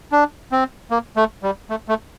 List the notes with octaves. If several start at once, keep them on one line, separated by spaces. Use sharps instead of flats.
D4
C4
A#3
A3
G3
A3
A3